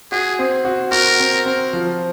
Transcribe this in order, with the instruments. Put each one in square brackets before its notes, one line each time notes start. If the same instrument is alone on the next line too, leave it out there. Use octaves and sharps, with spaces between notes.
[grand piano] F#4 [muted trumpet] G#4
[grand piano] C4
F#4
[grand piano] F#4 [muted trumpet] A#4
[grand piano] C4
C4
F3